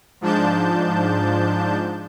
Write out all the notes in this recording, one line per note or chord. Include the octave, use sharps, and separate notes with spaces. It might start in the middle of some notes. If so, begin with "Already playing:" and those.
G#2 F3 D4 A5 G6